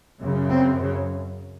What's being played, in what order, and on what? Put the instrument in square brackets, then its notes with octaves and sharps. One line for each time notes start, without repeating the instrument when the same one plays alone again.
[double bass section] F#2 C#3
C4
C#3